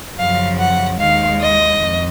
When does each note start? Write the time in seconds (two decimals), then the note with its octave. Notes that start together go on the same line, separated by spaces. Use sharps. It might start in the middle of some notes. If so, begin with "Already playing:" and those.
0.18 F#2 C#3 F3 F5
0.59 F#5
0.99 D#2 D#3 G#3 F5
1.40 D#5
1.80 F2